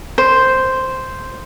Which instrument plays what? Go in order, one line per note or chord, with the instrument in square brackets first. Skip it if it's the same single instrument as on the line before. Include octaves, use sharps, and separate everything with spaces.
[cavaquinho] C5